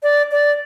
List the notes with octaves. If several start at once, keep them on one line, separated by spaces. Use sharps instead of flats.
D5
D5